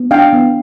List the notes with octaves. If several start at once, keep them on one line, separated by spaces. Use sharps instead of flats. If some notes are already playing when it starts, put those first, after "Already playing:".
Already playing: B3
D4 F5 G5
B3